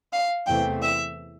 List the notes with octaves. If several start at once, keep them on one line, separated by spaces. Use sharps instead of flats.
F5
E2 C3 E3 A3 C4 G5
E5